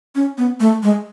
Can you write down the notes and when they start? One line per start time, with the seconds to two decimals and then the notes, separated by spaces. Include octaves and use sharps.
0.15 C#4
0.38 B3
0.60 A3
0.83 G#3